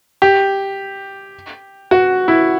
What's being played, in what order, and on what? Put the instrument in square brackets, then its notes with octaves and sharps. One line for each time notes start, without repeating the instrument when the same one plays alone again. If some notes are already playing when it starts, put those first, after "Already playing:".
[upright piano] G4
F#4
E4